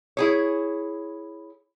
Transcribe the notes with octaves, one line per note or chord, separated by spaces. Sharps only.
E4 G#4 C#5